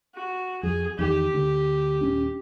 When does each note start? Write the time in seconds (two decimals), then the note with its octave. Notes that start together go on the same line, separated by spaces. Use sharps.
0.15 F#4
0.63 F2 G#4
0.99 E2 D#3 G4
1.33 D2 D3
2.01 D#1 C#4 D4